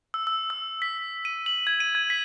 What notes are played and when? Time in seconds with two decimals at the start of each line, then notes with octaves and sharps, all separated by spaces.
0.14 E6
0.27 E6
0.50 E6
0.82 B6
1.25 D#7
1.46 F#7
1.67 G#6
1.80 D#7
1.95 G#6
2.10 B6